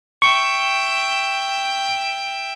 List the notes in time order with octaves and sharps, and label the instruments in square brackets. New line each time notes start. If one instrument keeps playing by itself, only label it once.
[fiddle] E5 G5 [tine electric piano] C#6